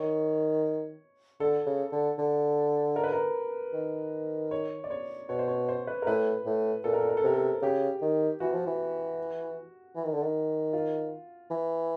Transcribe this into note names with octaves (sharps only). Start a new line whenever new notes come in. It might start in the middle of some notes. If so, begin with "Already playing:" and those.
Already playing: D#3 C#5
D3 A4
C#3
D3
D3
A#4
B4
A#4
D#3
C#5
D5
C#5
B2 C#5
C5
C#5
C5
B4
A#4
A2 B4
A2
A#2 A4
A#4
A4
A#4
A4
C3 A#4
A4
C#3 G4
D#3
E3 F#4
F3
E3
E3
D#3
D3
D#3
F4
E3